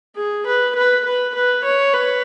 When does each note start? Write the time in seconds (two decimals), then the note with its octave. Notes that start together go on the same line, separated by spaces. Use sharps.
0.16 G#4
0.46 B4
0.76 B4
1.05 B4
1.35 B4
1.65 C#5
1.94 B4